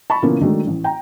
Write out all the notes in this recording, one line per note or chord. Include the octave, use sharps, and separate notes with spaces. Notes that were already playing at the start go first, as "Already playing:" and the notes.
A5 B5 C#6
A#2 C#3 E3 A#3 B3 C#4
D#3 F#3 G#3 A3 D4
A1
G5 A#5